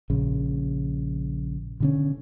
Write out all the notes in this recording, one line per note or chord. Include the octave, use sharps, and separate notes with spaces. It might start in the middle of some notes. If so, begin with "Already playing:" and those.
A#1 C#3
B2 D3 C#4